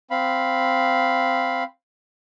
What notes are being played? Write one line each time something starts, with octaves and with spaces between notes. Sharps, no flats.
C4 F5 B5